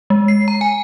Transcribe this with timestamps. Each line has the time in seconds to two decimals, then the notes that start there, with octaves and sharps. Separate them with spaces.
0.10 G#3
0.28 C7
0.48 A#5
0.61 G#5